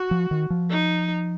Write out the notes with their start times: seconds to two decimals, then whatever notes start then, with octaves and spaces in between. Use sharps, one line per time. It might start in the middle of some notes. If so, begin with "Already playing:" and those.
Already playing: F#4
0.11 F3
0.31 D#3
0.50 F3
0.70 D#4